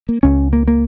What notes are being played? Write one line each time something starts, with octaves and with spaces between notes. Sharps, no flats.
A#3
C#2 C#3 C#4
A#3
A#3